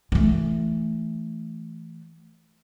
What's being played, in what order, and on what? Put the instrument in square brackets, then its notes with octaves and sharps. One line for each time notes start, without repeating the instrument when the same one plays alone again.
[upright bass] E3 A3